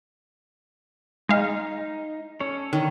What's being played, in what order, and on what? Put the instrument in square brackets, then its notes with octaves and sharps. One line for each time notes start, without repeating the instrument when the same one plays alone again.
[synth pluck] G#3 F5 [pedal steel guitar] D#4
[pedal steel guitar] C#4 A4 C#5
[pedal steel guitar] D3 C#5 [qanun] D#3